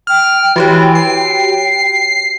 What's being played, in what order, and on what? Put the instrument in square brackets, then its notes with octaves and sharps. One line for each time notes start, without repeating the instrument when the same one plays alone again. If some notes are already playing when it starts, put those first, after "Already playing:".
[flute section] G5 [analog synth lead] F6
[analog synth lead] E3 [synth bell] F#4 G4 C#5
[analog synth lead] C7